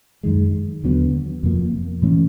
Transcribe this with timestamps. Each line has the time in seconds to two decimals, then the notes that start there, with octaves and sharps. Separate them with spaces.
0.23 F#2 D#3 G#3
0.83 D#2 D3 F#3 B3
1.43 F2 C3 F3 A#3
2.02 A2 E3 A3 C#4